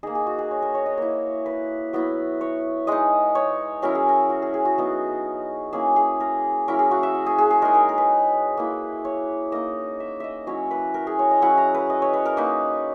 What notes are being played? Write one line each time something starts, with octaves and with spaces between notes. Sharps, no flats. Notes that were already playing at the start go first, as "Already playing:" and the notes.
A#3 D#4 G#4
G#4
F#4
G#4
C#5
A#4
C#5
D#5
A#3 E4 C#5
B4
F#3 B3 E4
C#5
G#3 D#4 D#5
C#5
F#3 C#4 E4 A#4
G#4
A#4
F#4
G#4
G#4
F#4
F#3 B3 D#4
A#3 C#4 E4 G#4
G#4
A#4
F#3 C#4 E4 A#4
G#4
F#4
E5
F#5
G#4
G#4
G#4
G#3 D#4 A#4
A#4
A#4
B4
A#3 E4
C#5
A#3 D#4 D#5
E5
D#5 E5
F#3 C#4 E4 C#5
B4
A#4
G#4
C#5
D#5
F#3 C#4 E4 F#5
A#5
B4
D#5
C#5
B4
A#4
A#3 D#4 B4